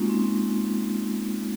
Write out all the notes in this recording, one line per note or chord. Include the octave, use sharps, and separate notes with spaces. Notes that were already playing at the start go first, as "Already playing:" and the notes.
Already playing: G#3 A#3 C#4 D#4 F4 F#4
C4